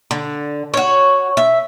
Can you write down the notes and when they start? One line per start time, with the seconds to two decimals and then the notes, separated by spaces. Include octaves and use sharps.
0.11 D3
0.74 F#4 C#5
1.37 E5